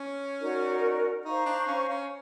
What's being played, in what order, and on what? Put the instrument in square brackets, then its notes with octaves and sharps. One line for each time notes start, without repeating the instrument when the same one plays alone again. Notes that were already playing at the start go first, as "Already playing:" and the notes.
Already playing: [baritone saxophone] C#4
[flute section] D#4 F#4 A#4 D5
[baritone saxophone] D#4 [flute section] C5 F5 A#5 C#6
[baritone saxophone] D4
C#4
C#4